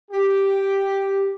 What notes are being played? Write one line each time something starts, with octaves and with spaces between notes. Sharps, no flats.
G4